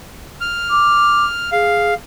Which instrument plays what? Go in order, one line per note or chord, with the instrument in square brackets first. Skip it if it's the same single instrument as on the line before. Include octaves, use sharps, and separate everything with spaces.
[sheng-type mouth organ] F6
[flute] D6
[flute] G#4 [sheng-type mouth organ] F5